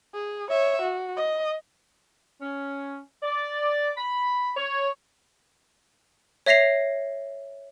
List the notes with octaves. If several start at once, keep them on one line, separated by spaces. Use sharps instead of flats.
G#4
C#5 E5
F#4
D#5
C#4
D5
B5
C#5
C#5 E5 A#6 C7 F7